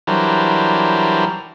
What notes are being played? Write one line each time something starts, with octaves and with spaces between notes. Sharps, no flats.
E3 F#3 G3 D4 A#4 C5